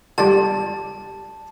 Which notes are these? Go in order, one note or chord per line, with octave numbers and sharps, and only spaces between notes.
E2 D3 G3 D4 A5